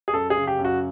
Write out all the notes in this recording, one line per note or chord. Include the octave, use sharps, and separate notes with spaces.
G#4
F#2 A4
G#4
C#3
G4
F#2
F#4